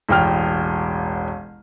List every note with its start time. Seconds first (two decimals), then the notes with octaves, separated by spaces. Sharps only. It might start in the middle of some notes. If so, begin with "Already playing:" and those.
0.09 E1 A1 G5 F6